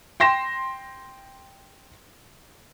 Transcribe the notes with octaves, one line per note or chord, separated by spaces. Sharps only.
G5 C6 A#6 E7